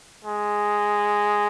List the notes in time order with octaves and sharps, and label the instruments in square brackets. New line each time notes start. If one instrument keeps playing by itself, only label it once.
[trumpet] G#3